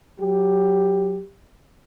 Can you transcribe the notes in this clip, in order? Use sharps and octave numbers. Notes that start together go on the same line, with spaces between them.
F#3 G4